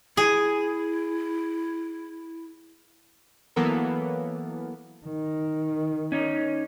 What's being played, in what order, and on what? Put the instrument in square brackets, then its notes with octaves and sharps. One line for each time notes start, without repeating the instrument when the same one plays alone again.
[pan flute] E4 [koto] G#4
[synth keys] E3 F#3 A#3 B3 A4 A#4
[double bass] D#3
[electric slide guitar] C#4 D#4